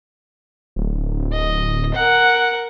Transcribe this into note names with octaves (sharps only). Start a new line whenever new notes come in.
D1
D#5
A#4 F#5